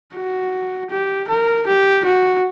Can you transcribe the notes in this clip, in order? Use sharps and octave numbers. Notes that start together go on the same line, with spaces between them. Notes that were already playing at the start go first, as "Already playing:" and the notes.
F#4
G4
A#4
G4
F#4